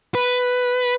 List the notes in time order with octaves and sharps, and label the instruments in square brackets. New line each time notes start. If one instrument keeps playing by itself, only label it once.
[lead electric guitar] B4